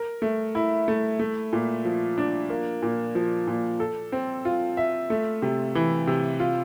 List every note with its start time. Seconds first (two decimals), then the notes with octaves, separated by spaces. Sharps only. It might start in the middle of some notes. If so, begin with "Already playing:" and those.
Already playing: A#4
0.22 A3
0.55 E4
0.88 A3
1.20 A3
1.53 A#2
1.85 F3
2.18 D4
2.50 A#3
2.82 A#2
3.15 F3
3.47 A#2
3.80 A4
4.12 C4
4.45 F4
4.77 E5
5.10 A3
5.42 C3
5.75 E3
6.07 C3
6.40 F4